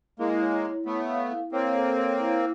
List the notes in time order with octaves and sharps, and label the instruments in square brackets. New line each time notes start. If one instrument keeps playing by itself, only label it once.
[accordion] G#3 A#3 [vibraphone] E4
[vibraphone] C#5
E4
[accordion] A3 B3 [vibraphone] C#5
[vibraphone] F5
E4
[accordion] A#3 C4 [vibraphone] C#5
[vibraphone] A4
C#5
E4